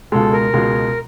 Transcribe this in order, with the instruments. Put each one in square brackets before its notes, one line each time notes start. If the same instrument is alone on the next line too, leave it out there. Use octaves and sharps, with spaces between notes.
[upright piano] C#2 B2 G#3 [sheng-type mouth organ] A4
[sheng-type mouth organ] A#4
[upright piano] C#2 B2 G#3